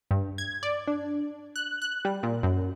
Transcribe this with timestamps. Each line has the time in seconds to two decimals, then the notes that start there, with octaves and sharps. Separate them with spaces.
0.11 G2
0.38 G#6
0.63 D5
0.87 D4
1.56 F#6
1.82 F#6
2.05 G3
2.23 A#2
2.43 F#2